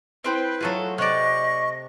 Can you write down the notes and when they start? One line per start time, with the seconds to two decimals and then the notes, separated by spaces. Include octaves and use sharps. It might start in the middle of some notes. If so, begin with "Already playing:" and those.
0.24 C4 E4 B4 C5 G5
0.61 F#3 A3 F4 F#4 G#4 A4
0.98 C3 G4 D5 D#5 C#6 F#6